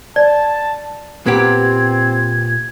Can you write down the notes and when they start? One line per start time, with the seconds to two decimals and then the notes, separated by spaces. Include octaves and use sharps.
0.16 D5 A5
1.26 A#2 B3 C4 G4 G#6